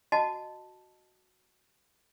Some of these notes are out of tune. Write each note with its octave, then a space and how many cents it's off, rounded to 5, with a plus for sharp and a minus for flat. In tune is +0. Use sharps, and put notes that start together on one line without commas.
F#4 +0 D#5 -15 A5 +0